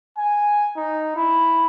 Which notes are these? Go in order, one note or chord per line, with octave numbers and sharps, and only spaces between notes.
G#5
D#4
E4